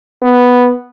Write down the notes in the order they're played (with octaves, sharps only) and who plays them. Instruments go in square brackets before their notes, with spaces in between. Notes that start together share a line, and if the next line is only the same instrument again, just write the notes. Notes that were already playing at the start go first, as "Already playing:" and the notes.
[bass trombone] B3